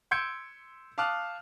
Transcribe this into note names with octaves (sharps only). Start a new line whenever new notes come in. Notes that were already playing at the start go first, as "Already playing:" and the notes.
C6 E6 G6 G#6 C#7 D7
F5 A5 D6 D#6 F6 F#6